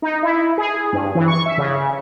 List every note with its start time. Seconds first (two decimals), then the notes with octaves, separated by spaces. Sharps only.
0.02 D#4
0.23 E4
0.58 G#4
0.92 G2
1.15 E3
1.28 C#6
1.46 E5
1.58 C#3